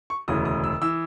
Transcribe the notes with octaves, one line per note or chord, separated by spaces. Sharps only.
C#6
E1 D2 C#3 E3 D#6
D#6
E6
E3 E6